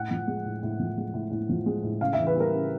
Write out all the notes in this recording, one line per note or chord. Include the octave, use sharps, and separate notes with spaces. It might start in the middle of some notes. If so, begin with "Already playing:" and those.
Already playing: A2 F#5
F3
G#3
A2
A2
F3
G#3
A2
A2
F3
G#3
A2
C#3 F5
E5
E3
B4
G3
A#4
C#3